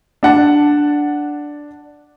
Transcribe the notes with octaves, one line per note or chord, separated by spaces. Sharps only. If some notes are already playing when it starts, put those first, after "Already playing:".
D4 F#5 A5